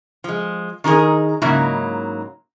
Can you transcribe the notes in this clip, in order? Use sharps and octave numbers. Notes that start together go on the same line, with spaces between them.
F3 G#3
D#3 D#4 G4 G#4 A#4
G#2 C#3 F#3 A#3 D#4 E4